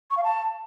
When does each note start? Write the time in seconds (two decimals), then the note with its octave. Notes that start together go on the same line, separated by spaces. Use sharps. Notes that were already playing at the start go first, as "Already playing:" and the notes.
0.11 C#6
0.17 F5
0.24 A5